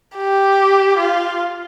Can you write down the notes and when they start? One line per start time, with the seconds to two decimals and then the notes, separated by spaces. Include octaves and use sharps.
0.17 G4
0.98 F4